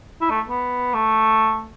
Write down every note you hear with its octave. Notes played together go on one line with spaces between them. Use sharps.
E4
A3
B3
A3